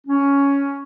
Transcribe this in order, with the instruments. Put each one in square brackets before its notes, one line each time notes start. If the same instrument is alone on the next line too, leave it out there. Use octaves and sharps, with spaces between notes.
[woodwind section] C#4